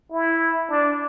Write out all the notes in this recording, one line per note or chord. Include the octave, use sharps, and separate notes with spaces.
E4
D4